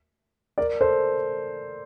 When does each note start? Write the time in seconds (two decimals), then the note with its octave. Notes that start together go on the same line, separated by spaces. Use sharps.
0.58 A#4 D5
0.81 A4 C5